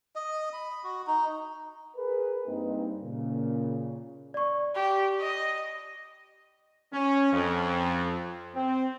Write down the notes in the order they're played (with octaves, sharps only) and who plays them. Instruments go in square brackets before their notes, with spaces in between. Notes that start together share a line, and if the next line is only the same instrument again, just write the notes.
[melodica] D#5
B5
F#4
D#4
[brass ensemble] G#4 A#4 B4
G2 A#3 C4 D#4 D#5
A#2 C#3
[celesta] D5 C#6
[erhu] G4
D#5
[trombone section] C#4
F2
C4